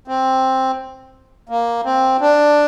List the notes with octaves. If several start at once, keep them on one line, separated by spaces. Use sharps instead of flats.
C4
A#3
C4
D4